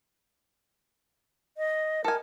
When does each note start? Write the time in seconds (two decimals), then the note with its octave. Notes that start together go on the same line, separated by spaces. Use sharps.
1.58 D#5
2.04 A4 A#4 G#5